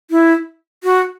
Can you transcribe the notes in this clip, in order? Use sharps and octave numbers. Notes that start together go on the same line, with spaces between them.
E4
F#4